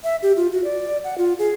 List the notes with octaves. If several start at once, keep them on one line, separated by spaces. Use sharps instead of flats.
E5
G4
F4
F#4
D5
F#5
F4
G#4